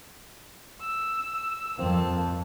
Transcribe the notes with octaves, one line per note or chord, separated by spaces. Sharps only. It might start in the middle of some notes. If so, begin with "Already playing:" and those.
E6
F2 A#3 C4 A5